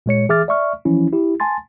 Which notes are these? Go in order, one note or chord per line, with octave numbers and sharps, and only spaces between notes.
A#2 G#3 C#5 C#7
E3 G#4 E5 D6 F6 A6
D5 E5 C#6 F6
E3 F3 C#4 E4
E4 G4
G#5 A5 C6 A6